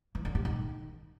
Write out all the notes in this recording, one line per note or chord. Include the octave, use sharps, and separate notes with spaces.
E3
D3
C3
D#3